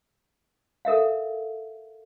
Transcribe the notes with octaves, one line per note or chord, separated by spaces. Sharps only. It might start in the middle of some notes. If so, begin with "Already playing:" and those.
A4 A#4 E5 F5